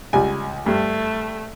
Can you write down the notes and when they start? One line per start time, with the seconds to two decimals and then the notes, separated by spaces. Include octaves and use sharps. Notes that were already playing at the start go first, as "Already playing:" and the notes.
0.13 C#2 G3 G#5
0.66 G2 A3